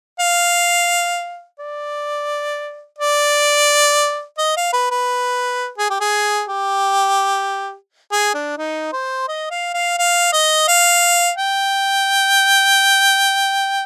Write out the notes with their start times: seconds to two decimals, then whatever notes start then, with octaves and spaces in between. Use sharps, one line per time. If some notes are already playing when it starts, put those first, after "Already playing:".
0.20 F5
1.60 D5
2.99 D5
4.39 D#5
4.57 F5
4.73 B4
4.91 B4
5.78 G#4
5.90 G4
6.01 G#4
6.49 G4
8.12 G#4
8.34 D4
8.58 D#4
8.93 C5
9.28 D#5
9.51 F5
9.74 F5
9.99 F5
10.33 D#5
10.68 F5
11.38 G5